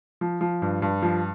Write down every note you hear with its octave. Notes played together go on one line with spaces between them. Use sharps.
F3
F3
G2
G2
F3